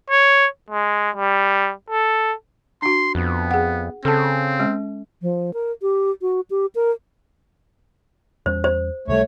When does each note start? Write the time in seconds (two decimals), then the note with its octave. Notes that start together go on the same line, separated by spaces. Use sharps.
0.10 C#5
0.70 G#3
1.16 G3
1.90 A4
2.82 D4 F#4 C6
3.15 F2 B3
3.51 G#4 F#5
4.05 C#3 C4 A4 A5
4.60 G#3 C#4
5.22 F3
5.54 A#4
5.82 G4
6.22 F#4
6.50 G4
6.75 A#4
8.46 E2 G3 C#4 C5
8.64 C5
9.08 C#2 C3 G3 A3 C#5